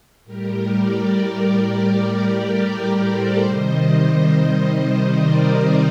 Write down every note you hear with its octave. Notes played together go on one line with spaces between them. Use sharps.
A2 G3 G4 A#4
A#4 D5
A#4 D5
G4 A#4
G4 A#4
A4 C5
C3 D#3 G3 C5 D#5
A#4 D5
C5 D#5